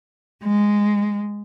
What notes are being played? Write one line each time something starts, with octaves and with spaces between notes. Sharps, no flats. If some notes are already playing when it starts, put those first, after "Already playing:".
G#3